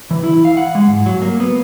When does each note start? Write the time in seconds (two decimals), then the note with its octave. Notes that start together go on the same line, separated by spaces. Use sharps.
0.11 E3
0.24 E4
0.45 F5
0.57 F#5
0.75 G#3
0.88 G#2
1.06 F#3
1.22 A#3
1.40 B3